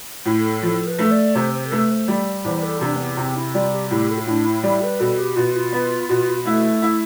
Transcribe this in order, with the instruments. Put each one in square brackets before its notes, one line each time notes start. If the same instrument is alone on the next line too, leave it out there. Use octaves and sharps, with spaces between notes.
[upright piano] A2
[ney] A4
[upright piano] F3 [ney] A4
[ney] B4
[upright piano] A3
[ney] D5
[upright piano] C3 [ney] C5
[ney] C5
A4
[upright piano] A3 [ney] B4
[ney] C5
[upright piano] G3 [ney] D5
[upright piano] E2 [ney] C5
[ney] A4
[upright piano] C3 [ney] D4
[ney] A3
B3
[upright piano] C3 [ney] C4
[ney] E4
[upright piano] G3 [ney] F4
[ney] G4
[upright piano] A2 [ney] G4
[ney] A4
E4
[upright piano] A2 [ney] D4
[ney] E4
[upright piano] G3 [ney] E4
[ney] B4
[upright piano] B2 [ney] A4
[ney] G4
[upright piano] B2 [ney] F4
[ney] F4
[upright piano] B3
B2
[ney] A3 [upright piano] E4
[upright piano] E4